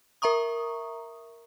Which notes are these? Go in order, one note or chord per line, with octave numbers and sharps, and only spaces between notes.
A#4 E5 A#5 C#6 D#6